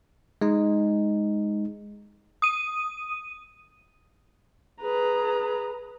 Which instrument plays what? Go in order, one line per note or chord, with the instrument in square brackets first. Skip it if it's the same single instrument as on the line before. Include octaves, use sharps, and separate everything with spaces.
[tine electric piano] G#3 D#4
[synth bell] D#6 D#7
[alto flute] G#4 [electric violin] B4 A#5